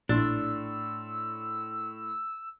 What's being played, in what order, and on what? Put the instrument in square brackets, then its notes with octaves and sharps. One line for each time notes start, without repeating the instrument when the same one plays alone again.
[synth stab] A#1 [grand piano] A2 C6 A6 [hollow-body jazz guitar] D4 [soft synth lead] E6